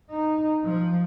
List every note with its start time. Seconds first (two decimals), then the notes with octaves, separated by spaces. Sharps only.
0.10 D#4
0.64 F3